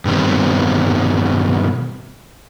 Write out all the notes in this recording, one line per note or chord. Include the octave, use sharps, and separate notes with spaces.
G2 B2 D#3 G3 C4